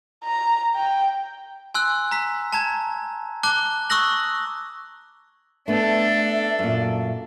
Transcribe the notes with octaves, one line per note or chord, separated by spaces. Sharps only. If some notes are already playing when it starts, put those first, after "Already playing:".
A#5
G5
G#5 C6 E6 F#6
A#5 B6
A5 A#5 G#6
A5 D6 F#6 G7
C#6 D#6 E6 F#6 A#6 F#7
A3 B3 D4 A4 E5
F#2 A#2